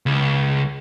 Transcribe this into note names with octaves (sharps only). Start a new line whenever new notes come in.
C#2